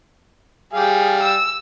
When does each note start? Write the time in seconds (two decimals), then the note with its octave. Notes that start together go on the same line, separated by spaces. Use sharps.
0.73 G3 G4 G#4 F5
1.23 E6